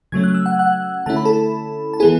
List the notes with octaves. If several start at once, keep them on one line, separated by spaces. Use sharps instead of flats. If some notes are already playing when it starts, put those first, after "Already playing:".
C#3 F#3 A3 C#4 G#6
F#6
E6
F#5 F#6
F#5 F#6
D3 A3 C#4 E4 A5
B5
A4 A5
A5
E3 B3 E4 G#4 G#5